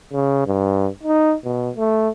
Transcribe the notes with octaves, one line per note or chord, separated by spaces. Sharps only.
C#3
G2
D#4
B2
A3